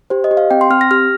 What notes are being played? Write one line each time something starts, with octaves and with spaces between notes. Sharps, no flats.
G4 C5
D#5
G4
F5
C4 G5
C6
C4 F6
A#6
G4 F6